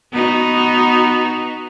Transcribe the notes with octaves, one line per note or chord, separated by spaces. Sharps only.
B3 D#4 F#4